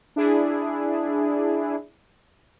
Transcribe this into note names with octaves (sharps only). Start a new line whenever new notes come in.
D4 E4 G#4